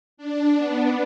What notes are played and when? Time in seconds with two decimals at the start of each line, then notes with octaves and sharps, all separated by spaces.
0.17 D4
0.57 B3